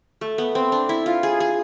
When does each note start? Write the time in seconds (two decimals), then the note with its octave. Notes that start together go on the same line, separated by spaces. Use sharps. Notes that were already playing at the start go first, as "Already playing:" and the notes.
0.21 A3
0.38 B3
0.55 C4
0.72 D4
0.89 E4
1.06 F4
1.23 G#4
1.40 G#4